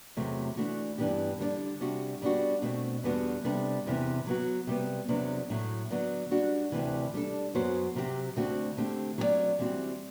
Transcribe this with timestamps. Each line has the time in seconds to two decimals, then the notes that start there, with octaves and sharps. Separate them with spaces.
0.17 E2 C3 F#3 A3
0.57 E3 A3 D4 F#4
0.98 G2 E3 B3 D4 G4
1.39 D3 G3 D4 A4 D5
1.81 C3 G3 D4 F#4
2.22 G3 B3 D4 F#4
2.62 B2 A3 C4
3.04 E2 D3 G3 B3 F#4
3.44 C3 G3 B3 D4 A4
3.86 E2 C3 E3 B3
4.27 F#3 B3 F#4
4.67 C3 G3 B3
5.08 E2 C3 F#3 B3 D4
5.50 A2 F#3 A3
5.90 D3 F#3 B3 F#4
6.31 G3 D4 F#4
6.72 D2 C3 E3
7.14 G3 D4 A4
7.55 F#2 F#3 B3 F#4 C5
7.95 C3 F#3 C4 G4
8.36 D2 D3 A3 C4 F#4
8.77 D3 A3 C4 G4
9.18 F#3 C4 G4 D5
9.59 E3 G3 C4 F#4